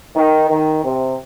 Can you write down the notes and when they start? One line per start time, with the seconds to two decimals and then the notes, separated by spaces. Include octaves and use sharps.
0.16 D#3
0.50 D#3
0.84 C3